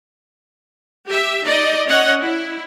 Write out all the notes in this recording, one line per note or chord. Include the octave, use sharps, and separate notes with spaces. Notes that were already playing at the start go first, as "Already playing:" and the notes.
G4 E5
D#4 D5 D#5
C#4 C#5 D#5 F#5
E4